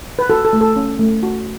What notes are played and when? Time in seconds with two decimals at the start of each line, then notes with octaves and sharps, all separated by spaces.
0.19 B4
0.30 F#4 A4
0.45 A4
0.53 A3
0.61 A4
0.76 C#4
0.99 A3
1.23 F#4